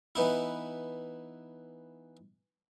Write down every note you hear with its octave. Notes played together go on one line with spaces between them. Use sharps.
E3 B3 D#4 E4